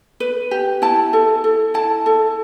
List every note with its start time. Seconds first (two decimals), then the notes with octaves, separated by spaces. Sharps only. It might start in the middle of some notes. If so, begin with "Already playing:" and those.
0.20 B4
0.51 G4
0.82 E4 A5
1.13 A4
1.44 A4
1.74 E4 A5
2.06 A4